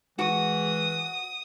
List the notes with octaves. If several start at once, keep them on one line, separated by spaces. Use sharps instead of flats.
E3 G#3 F#4 D#6